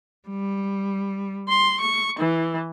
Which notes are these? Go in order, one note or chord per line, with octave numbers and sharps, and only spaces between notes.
G3
C6
C#6
E3